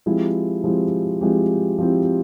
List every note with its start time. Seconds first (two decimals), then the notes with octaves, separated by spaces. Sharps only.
0.06 F3 G#3 C4 E4 G4
0.64 F3 G#3 C4 E4 G4
1.21 F3 G#3 C4 E4 G4
1.78 F3 G#3 C4 E4 G4